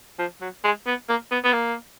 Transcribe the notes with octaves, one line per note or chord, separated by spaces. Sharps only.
F3
F#3
G#3
B3
A#3
B3
B3
A#3